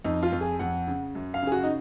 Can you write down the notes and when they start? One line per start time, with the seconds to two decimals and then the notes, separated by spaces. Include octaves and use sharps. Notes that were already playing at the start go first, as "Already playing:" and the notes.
0.04 F2 D#4
0.23 F4
0.32 F2
0.41 G#4
0.59 F2 F#5
0.87 C#3
1.15 F#2
1.34 F5
1.42 C#3 G#4
1.52 F#4
1.63 D#4